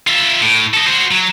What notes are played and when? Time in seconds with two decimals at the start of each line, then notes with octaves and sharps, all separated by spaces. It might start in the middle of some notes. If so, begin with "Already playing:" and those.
0.07 F4 E5
0.41 A2
0.74 A4 D#5
0.87 F#4 C5
1.11 F#3